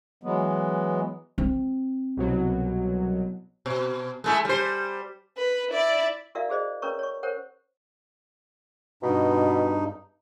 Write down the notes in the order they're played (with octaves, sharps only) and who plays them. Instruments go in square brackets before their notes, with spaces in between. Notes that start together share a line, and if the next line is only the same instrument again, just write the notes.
[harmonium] E3 F#3 G#3 B3
[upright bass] C4
[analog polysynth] C2 B2 F#3
[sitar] B2
G#3 A3 E4
G3 C5
[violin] B4
E4 D5
[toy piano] E4 F#4 A#4 D5 E5 F5
F#4 G#4 C5 D5 D#5
C#4 A#4 B4 C#5 A#5 C#6
C#5 C#6
A#4 C5 C#5 F#5
[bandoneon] G2 D#4 [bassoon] B2